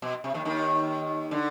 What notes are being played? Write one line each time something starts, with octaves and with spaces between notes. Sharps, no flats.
B2
C3
D#2 D#3
D#2 D#3
D3